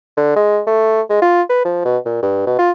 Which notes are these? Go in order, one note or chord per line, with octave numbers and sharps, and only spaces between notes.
D3
G#3
A3
G#3
F4
B4
F3
B2
A#2
G2
B2
F4